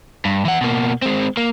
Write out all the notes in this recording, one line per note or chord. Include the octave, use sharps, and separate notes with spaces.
G2
E3 F#5
B2 A#3
G#3 C4
A#3